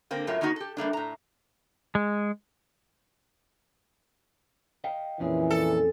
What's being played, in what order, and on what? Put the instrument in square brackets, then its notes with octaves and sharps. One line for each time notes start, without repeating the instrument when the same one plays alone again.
[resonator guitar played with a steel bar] D3 A#3 C4
F#2 A2 F#3 F4 A#4 E5
D#3 A#3 B3 D#4 F#4
G4 A4
G3 A3 A#3 D4
A2 A#5
[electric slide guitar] G#3
[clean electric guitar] D#5 F5 G5
[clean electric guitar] F2 C#4 G#4 [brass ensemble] A#2 E3
[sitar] A4